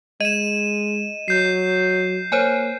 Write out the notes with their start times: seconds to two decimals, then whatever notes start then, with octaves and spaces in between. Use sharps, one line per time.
0.21 G#3 D#5 D#7 E7
1.28 F#3 G6 C7
2.32 A#3 C5 C#5 G#5